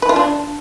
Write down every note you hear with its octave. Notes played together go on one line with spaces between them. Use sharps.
B4
F4
D4